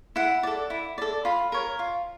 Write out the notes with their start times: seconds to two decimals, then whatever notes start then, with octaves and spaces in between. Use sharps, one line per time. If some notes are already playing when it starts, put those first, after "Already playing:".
0.16 E4 F#5
0.43 A4 D5
0.70 E4
0.98 A4 D5
1.25 F4 B5
1.52 A#4 C#5
1.79 F4